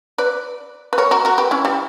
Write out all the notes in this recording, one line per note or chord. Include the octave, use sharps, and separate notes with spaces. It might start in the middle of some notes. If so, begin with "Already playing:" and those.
B4 D5
B4
A#4 C#5
F#4 A#4
F#4 A#4
G4 B4
C#4 E4
G3